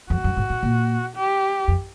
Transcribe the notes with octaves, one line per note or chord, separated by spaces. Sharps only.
F2 F#4
F#2
G#2
A2
A#2
G4
F2